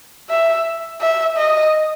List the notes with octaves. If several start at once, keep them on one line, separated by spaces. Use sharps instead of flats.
E5
E5
D#5